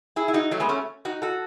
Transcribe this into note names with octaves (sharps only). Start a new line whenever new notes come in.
E4 G#4
E4
D#4 F#4
F#3 A3
G#3 B3
A3 C#4
D#4 F#4
F#4 A4